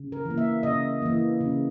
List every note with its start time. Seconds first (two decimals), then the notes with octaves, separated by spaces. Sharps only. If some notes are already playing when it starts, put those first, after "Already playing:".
Already playing: C#3
0.12 A#4
0.25 E3
0.30 A#3
0.38 E5
0.63 C#3 D#5
1.02 E3 A#3
1.41 C#3